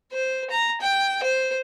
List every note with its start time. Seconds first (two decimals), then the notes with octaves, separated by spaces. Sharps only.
0.12 C5
0.50 A#5
0.81 G5
1.23 C5